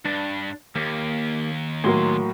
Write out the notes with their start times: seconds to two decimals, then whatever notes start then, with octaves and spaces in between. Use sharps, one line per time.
0.05 G2 D4
0.76 D#2 A#3 G4
1.84 A2 F#3 A#3 G#5 C6